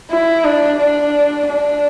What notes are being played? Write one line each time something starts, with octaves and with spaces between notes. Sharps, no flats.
E4
D4
D4
D4